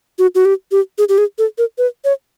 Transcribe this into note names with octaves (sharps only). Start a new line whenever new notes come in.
F#4
F#4
G4
G4
G#4
G4
G#4
A4
A#4
B4
C#5